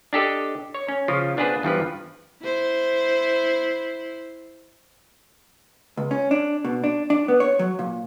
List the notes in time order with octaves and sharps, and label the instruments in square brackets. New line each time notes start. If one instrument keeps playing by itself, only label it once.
[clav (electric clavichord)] D4 G4 A4 D#5
C#5
C#4
C#3 F3 F4
B3 D4 F4 G#4 B4 C5
E2 G2 F3 B4
[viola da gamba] E4 C5
[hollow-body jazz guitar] C#2
C#4
D4
B2
D4
D4
B3
C#5
F#3
A#2